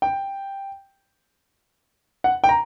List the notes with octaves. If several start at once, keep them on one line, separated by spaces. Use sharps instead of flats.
G5
F#5
G5
A#5